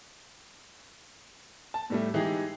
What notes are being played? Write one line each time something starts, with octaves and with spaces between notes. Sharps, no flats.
A5
A2 G3 A3
E3 G#3 D#4 E4 G4 G#4